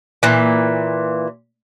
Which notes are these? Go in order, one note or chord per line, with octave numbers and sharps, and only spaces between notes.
A#2 E3